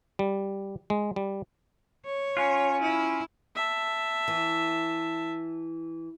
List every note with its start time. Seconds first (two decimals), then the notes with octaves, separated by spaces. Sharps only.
0.19 G3
0.90 G#3
1.16 G3
2.06 C#5
2.37 C#4 F4
2.81 E4
3.55 E5 A5
4.28 E3